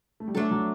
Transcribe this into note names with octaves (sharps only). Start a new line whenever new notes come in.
A3
G3
F#3 A3 D4 A4
F#3